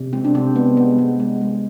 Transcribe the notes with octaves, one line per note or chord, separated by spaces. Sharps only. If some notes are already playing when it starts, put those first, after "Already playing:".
Already playing: C3
G#3 C4
D4
C3 C4
G#3 B3
G#3 B3
G#3
G#3
G#3